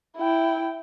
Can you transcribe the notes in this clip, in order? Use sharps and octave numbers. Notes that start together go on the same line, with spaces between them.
E4 G5